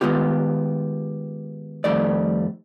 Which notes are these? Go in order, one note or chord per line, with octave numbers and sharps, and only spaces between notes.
D#3 F3 G#3 B3 F4 G4
F2 D#3 G3 A3 D5